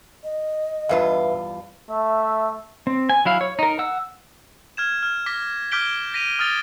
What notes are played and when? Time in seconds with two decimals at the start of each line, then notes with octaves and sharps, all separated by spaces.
0.24 D#5
0.89 E2 G2 F4 B4 E5 F5
1.90 A3 E5
2.87 C4
3.09 G#5
3.25 F#3 E4 F5
3.41 C#5
3.59 D#4 A#4
3.79 F#5 E6
4.77 F6 G#6 E7
5.03 F6
5.26 D6 F6 A#6 B6
5.72 D6 F6 G6 B6 D7 G7
6.14 A#6 B6 D#7 F7
6.39 D#6 F6 A6 A#6 D7 G7